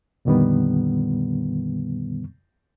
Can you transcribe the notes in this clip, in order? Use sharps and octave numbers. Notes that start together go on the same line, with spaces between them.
F2 A#2 D3 D#3 G3 B3